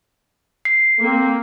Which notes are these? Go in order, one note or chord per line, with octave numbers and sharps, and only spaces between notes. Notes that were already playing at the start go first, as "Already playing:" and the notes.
C7
A#3 C4